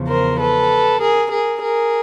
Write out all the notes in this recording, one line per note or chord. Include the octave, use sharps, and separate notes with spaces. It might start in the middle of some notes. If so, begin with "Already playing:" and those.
Already playing: E2 C#3 F3
A#4 C5
A4 B4
G#4 A#4
G#4 A#4
G#4 A#4